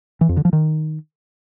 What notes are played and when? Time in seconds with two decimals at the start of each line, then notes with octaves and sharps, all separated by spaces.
0.21 E3
0.29 F2
0.37 D3
0.45 F3
0.53 D#3